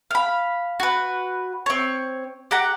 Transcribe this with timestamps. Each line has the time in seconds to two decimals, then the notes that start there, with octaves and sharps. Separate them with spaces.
0.11 F5 B5
0.80 F#4 B4
1.66 C4 C#5
2.51 G4 F#5 A#5